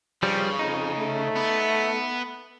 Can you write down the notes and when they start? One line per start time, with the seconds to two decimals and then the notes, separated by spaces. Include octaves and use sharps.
0.23 G2 C#3 F3 G3
0.59 F2 D#4
0.97 A3
1.36 B3